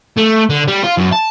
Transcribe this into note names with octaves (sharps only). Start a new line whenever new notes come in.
A3
D3
G3
F4
F#2
A5